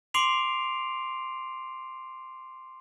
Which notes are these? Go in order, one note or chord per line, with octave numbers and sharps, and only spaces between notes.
C6 D6 C7 D7 F7